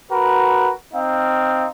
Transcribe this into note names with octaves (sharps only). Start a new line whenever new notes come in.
F#4 A#4 B4
C4 D#4 F5